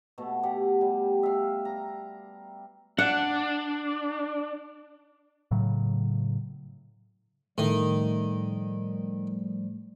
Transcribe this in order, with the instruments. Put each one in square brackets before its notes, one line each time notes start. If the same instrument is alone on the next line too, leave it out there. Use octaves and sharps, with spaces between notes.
[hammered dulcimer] B2 A3
G4 F#5
G3
E5 F5
A#5
[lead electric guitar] D4 [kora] F#5
[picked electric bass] A2 C#3 F#3
[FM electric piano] A2 A3 [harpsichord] D#3 [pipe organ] F3 G3